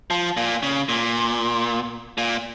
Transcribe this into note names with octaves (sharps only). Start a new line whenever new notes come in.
F3
A#2
C#3
A#2
A#2